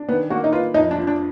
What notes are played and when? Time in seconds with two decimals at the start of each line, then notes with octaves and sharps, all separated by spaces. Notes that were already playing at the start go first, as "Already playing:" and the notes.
Already playing: D4
0.08 D#3 B3
0.30 A#3 F#4
0.44 D#4
0.52 F4 B4
0.74 F2 D#4
0.91 D4
0.96 F3
1.07 D4